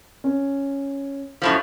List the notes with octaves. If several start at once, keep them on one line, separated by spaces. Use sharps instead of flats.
C#4
F#2 A2 F3